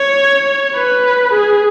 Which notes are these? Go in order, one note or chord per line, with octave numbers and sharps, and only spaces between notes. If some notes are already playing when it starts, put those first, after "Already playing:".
Already playing: C#5
B4
G#4